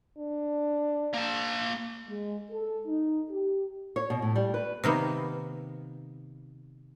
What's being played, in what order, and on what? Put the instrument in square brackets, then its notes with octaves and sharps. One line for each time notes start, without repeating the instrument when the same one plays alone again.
[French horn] D4
[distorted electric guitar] A#3 A5
[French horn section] G#3
A4
D#4
G4
[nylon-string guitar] C#5
B2
A2
G3
B4
[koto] C3 D#3 A#3 B3